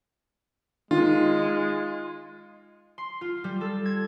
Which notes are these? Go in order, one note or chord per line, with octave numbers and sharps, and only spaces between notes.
D#3 G#3 F4
C6
F4
G3
A4
G#6